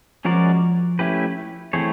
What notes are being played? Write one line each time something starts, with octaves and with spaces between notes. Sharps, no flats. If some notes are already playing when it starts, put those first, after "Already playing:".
F3 G#3 C#4 F#4 A#4 D5
A3 C#4 E4 G4 B4
E3 A3 C4 E4 G#4 C#5